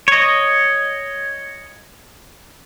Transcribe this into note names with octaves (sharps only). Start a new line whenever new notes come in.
C#5 D#5